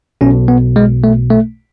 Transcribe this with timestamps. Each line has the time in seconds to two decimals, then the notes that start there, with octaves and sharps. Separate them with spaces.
0.21 B1 B2 C#4
0.48 B3
0.76 G#3
1.04 A3
1.31 A3